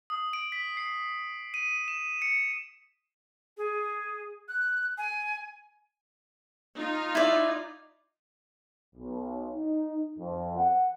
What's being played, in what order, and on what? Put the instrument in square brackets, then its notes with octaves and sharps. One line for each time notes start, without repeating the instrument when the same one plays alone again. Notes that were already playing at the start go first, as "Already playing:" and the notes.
[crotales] D#6
D7
B6
C7
D#7
E7
C#7
[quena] G#4
F#6
G#5
[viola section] D#4 F4
[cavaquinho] E4 D5
[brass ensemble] B1
D#4
F2
F#5